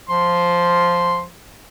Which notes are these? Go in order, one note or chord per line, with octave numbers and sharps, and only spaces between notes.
F3 C6